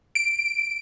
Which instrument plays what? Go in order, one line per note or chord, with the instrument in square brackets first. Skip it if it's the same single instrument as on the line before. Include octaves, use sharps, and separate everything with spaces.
[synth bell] D7